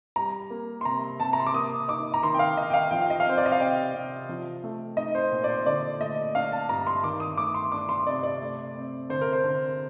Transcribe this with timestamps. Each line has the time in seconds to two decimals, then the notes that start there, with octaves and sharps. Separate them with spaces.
0.16 G3 A#5
0.50 A#3
0.81 C6
0.85 C3 A#5
1.20 C3 A5
1.33 A#5
1.40 C6
1.47 D6
1.54 A#3 D#6
1.88 D#4 D6
2.14 A#5
2.23 D#3 C6
2.34 G5
2.39 F5
2.57 D#3 D#5
2.70 G5
2.74 F5
2.91 F3 G5
3.01 F5
3.10 D#5
3.20 F5
3.25 C4 C5
3.38 D5
3.46 D#5
3.52 F5
3.60 C3 G5
3.94 C3
4.29 F3
4.64 A3
4.97 D#4 D#5
5.15 C5
5.32 A#2
5.44 D5
5.49 C5
5.66 D3 D5
6.00 A3 D#5
6.35 D4 F5
6.52 A5
6.69 G2 A#5
6.87 C6
7.03 D#3 D6
7.20 D#6
7.38 A3 D6
7.54 C6
7.72 D4 D6
7.89 C6
8.06 C3 D5
8.23 D5
8.41 A3
8.75 C4
9.09 D3 C5
9.21 A#4
9.33 C5
9.44 D3